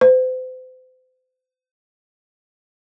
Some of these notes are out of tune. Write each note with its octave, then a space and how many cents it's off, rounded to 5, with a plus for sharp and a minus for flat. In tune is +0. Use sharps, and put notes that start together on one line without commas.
C5 -35